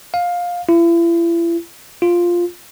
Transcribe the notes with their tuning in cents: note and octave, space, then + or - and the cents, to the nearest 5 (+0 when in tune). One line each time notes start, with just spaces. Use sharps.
F5 +15
E4 +40
F4 +0